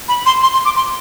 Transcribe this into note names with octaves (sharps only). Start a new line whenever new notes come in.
B5
C6
C6
C6
D6
C6